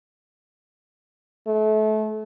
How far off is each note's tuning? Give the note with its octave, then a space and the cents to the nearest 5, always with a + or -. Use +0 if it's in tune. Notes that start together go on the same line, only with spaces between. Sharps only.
A3 -30